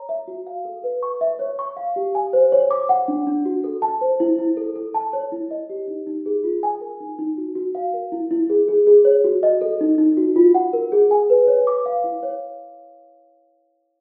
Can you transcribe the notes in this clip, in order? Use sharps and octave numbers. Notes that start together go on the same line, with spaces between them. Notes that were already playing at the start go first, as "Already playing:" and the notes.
Already playing: C#5 A#5
E5
F#4
F5
A4
B4
C#6
E5
C#5
C#6
F5
G4
G#5
C5
C#5
D6
F#5
D4
D4
F#4
A4
A5
C5
E4
E4
A4
A4
A5
C#5
E4
D#5
G4
D#4
D#4
G#4
F4
G#5
A#4
D#4
D#4
F#4
F#4
F5
A#4
E4
E4
G#4
G#4
G#4
C#5
F#4
D#5
A4
D#4
D#4
F#4
F4
F#5
A#4
G#4
G#5
B4
C#5
D6
F5
E4
C#5